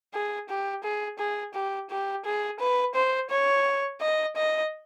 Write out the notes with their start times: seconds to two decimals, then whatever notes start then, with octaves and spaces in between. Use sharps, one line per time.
0.14 G#4
0.49 G4
0.83 G#4
1.19 G#4
1.54 G4
1.90 G4
2.25 G#4
2.60 B4
2.94 C5
3.30 C#5
4.01 D#5
4.36 D#5